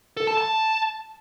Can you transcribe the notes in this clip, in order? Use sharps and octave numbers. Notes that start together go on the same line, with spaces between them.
A4
A5
A5